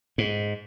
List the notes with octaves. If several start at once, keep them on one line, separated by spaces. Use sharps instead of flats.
G#2